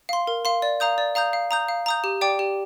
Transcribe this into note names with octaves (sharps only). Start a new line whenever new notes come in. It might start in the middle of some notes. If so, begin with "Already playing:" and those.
F5 C6
A#4
F5 C6
D5
F5 A#5 D#6 G6
D5
F5 A#5 D#6 G6
F5
A#5 D#6 G6
F5
A#5 D#6 G6
G4
D5 G5 D6
G4